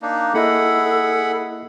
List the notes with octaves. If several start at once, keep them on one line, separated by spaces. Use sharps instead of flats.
A#3 D4 D#4
A#3 E4 G#4 A4 D#5 F#5 B5